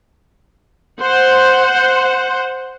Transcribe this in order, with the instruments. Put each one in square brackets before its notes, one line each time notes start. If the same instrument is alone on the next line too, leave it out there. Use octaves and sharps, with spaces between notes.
[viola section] C5 F#5